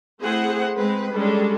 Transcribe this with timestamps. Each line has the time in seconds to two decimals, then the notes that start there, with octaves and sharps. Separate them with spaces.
0.20 A3 C4 E4 G#4 C5 F#5
0.75 G#3 C4 B4
1.14 G3 G#3 C#4 D4 A4